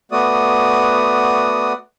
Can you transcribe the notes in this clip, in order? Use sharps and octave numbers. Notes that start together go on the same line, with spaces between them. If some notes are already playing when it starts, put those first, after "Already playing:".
A3 B3 F#4 D5 D#6